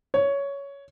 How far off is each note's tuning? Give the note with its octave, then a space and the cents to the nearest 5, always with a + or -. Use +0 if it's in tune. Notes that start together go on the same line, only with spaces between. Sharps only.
C#5 +10